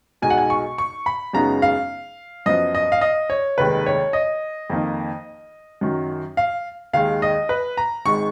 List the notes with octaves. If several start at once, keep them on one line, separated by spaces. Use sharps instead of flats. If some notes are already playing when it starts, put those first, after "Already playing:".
B1 B2 G#3 D#4 G#5
F#5
G#5
C#6
C#6
B5
F#2 C#3 G#3 B3 D#4 A#5
F5
F#2 F3 B3 D#5
D#5
F5
D#5
C#5
F1 D#2 D#3 G#3 B4
C#5
D#5
F2 D#3 A#3 D#4
F#2 D#3 F#3
F5
D#2 D#3 G#3 F5
D#5
B4
A#5
G#1 G#2 D#3 G#3 C#6